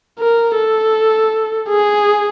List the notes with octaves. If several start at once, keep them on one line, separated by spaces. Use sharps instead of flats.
A#4
A4
G#4